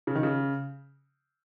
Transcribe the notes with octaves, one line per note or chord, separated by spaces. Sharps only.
C#3
D#3
C#3